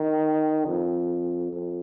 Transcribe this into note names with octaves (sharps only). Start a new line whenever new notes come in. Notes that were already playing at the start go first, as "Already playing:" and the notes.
Already playing: D#3
F2
F2